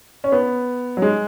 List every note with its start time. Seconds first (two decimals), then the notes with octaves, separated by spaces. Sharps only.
0.24 C#4
0.32 B3
0.97 F#3
1.02 G#3